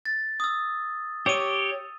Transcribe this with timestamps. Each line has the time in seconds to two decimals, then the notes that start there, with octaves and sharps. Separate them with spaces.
0.05 A6
0.40 D#6 E6
1.26 G4 C#5 E6 D#7